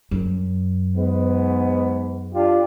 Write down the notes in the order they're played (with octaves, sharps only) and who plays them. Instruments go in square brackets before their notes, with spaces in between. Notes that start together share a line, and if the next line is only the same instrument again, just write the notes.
[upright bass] F#2
[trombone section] G#2 B3
D4 F4 G4